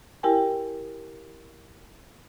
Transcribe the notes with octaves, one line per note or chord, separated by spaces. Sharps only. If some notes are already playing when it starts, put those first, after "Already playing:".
E4 G4 A#4 G5 G#5